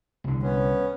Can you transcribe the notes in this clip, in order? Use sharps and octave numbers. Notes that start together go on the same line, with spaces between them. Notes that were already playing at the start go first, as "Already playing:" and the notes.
C2 D3
B3 C#4